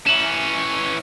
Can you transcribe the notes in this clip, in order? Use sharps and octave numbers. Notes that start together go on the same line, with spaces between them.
E3 C#4 E7 F#7